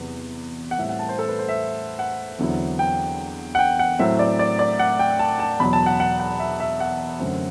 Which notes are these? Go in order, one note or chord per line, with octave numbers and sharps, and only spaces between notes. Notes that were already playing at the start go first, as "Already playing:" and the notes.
Already playing: E2 C3 F#3 B3
F#5
A2 G3 C4 E5
F#5
A5
C5
A4
B4
C5
E5
F#5
E2 D3 F#3 C4 E4
G5
F#5
G5
F#5
A2 F#3 C4 E4 E5
D5
D5
D5
F#5
G5
A5
A5
E2 B2 F#3 B5
A5
F#5
F#5
F#5
E5
E5
F#5
F#2 D3 F#3 A3 C4